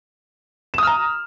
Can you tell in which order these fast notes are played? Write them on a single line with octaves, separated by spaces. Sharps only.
E7 D#6 F6 A#5